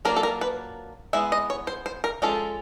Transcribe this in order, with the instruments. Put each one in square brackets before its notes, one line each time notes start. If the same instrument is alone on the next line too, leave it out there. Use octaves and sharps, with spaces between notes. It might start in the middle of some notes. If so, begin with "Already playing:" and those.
[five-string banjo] F#3 A#3 D4 F4 A#4
A4
A#4
B4
G#3 B3 E4 E5
D#5
C#5
C5
C5
A#4
F3 G#3 C#4 F4 A4